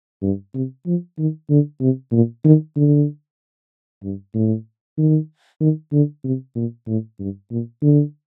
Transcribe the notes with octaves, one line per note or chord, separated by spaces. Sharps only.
G2
C3
F3
D#3
D3
C3
A#2
D#3
D3
G2
A2
D#3
D#3
D3
C3
A#2
A2
G2
A#2
D3